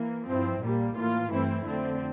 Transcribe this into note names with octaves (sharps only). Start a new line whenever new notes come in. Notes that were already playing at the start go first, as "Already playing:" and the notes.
Already playing: E3 A#3
G2 F3 C4 E4
A#1 A#2 G3 A#3
A2 E3 A#3 F4
G2 E3 A3 C4 E4
F2 D3 A3 C4